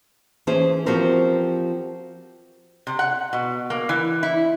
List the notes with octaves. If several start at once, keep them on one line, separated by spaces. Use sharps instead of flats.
E3 C#4 G#4 C5
F3 C4 F#4 G4 A#4 C5
C3
F#5
B2
A#3
E3
E4